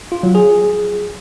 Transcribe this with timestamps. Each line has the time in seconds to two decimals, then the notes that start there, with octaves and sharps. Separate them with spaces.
0.12 F4
0.23 F#3
0.35 G#4